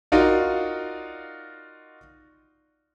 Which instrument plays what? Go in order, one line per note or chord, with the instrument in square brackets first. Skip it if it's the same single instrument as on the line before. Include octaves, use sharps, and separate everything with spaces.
[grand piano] D#4 F4 F#4 A#4 D5 F5